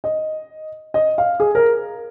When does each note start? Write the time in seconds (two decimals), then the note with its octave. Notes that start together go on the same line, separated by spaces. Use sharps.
0.04 D#5
0.94 D#5
1.18 F5
1.40 G#4
1.55 A#4